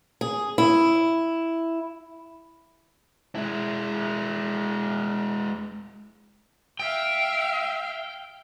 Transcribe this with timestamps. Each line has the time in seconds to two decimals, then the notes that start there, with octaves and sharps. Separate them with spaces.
0.21 G#4
0.58 E4
3.35 G#3 E4
6.80 E5 F5 G5